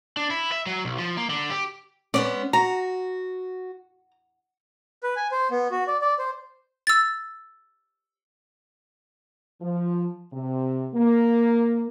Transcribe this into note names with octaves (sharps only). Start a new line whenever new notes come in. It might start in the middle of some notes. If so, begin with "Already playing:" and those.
D4
E4
E5
F#3
B1
F3
A#3
D3
G4
G#3 B3 C#4 D5
F#4 A#5
B4
G#5
C5
B3
F#4
D5
D5
C5
E6 A6
F3
C3
A#3